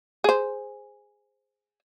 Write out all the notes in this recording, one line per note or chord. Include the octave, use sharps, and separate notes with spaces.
G#4 C5